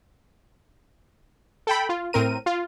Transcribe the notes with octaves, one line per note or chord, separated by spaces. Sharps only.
A4 G5 B5
F4
A2 C4 A#4 D#7
F4